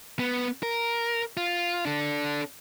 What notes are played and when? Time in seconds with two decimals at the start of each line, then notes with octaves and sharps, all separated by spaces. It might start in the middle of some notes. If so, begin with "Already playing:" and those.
0.19 B3
0.63 A#4
1.37 F4
1.86 D4 A4